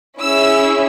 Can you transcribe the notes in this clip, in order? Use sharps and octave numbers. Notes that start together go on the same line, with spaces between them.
C#4 E4 G#4 E6